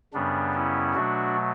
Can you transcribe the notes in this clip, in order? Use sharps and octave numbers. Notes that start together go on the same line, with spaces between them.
F#2 C#3 G3 B3 D4
C#4 E4
B2 F#3 A3 D4 F#4